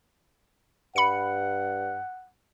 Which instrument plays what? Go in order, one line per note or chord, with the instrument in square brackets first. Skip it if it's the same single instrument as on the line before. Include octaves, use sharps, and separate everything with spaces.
[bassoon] G2 [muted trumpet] F#5 [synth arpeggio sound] B5 C#7